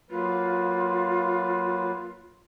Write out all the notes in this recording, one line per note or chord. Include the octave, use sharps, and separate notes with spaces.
F#3 A#3 F4 B4